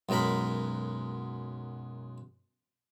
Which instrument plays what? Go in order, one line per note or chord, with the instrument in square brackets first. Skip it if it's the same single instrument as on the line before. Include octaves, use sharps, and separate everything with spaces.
[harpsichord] B1 F#2 G#3 A#4 B5